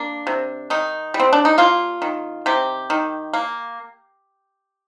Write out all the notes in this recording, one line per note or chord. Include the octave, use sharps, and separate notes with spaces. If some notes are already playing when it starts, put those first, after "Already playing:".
Already playing: A#3 D4
C3
D#3 D#4
G3
C4
D4
D#4
A#3 F4
D#3
C3 G4
D#3
A#3